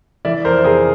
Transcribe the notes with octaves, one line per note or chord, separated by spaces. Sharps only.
E3 D5 E5
F2 A#4 C5
C3 G#4 A#4